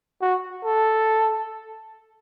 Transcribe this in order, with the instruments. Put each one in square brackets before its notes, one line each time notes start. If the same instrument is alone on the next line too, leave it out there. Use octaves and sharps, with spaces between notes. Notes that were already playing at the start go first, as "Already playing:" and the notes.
[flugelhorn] F#4
A4